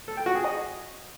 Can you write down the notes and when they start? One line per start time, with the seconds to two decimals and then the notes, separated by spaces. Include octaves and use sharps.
0.08 A4
0.17 G5
0.26 F#4
0.35 G#4
0.44 D#5